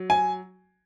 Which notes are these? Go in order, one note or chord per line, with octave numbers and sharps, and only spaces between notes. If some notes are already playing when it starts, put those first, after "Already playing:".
Already playing: F#3
G#5